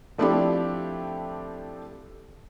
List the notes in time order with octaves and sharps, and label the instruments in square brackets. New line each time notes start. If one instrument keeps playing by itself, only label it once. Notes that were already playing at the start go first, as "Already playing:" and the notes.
[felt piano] F3 A3 C4 D4 E4 G4